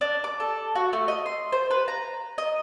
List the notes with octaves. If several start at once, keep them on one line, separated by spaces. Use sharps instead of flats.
D4
D6
A4
F#4
A3
D#5
C6
C5
B4
A#5
D#5